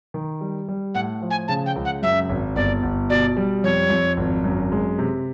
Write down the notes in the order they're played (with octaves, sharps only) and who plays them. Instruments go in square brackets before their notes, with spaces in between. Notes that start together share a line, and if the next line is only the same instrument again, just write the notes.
[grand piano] D#3
G3
G3
[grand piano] A2 [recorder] F#5
[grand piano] F3
[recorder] G#5
[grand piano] C#3 [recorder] A5
[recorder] G5
[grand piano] C#2
[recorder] F#5
[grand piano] F#2 [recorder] E5
[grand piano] G#1
[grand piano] G1 [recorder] D5
[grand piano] G1
[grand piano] B2 [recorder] D5
[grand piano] G3
[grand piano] F2 [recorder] C#5
[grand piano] F2
G#1
F#2
G#3
C3